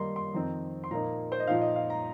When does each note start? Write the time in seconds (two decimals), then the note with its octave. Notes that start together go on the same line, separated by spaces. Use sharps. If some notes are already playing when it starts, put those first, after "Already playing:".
Already playing: D#3 G3 A#3 D#4 A#5 C6
0.16 C6
0.34 F2 D#3 C4 D#4 A#5
0.84 C6
0.91 A#2 F3 A#3 D#4 A#5
1.32 C5
1.40 D#5
1.47 A#2 F3 D#4 F5
1.62 D#5
1.76 F5
1.90 A#5